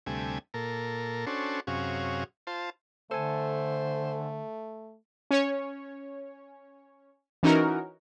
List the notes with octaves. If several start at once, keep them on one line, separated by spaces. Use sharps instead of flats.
D2 C3 G3 A3 G#5
A#2 A4 A#4
C#4 D4 F#4 A4 C5
F#2 C3 C#4 F#4 G#4 F5
F4 C5 A5
D3 A3 A4 C5 G#5
C#4 C#5
E3 C#4 D#4 F#4 A#4